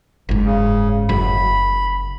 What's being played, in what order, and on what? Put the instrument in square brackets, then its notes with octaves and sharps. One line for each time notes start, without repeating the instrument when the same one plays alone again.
[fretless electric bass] F#1 G#2
[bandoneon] C#3
[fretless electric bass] F#1 F#2 [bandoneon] B5